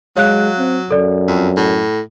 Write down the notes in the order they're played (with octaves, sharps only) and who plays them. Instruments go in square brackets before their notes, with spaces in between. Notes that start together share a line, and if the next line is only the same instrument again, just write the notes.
[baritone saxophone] F#3 [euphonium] G#3 [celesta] C#5 F5 F#6
[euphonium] C4
[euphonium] F#2 [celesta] A4 D5
[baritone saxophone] F2
A2